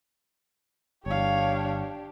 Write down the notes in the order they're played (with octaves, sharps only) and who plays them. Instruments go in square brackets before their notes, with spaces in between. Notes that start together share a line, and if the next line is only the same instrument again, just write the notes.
[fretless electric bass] G1 [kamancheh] D4 G4 [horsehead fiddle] C#5 F5